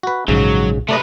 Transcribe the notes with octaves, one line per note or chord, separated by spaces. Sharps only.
F#4 B4
A#1 G#2 C#3 F#3
C3 A3 B4 D5 D#5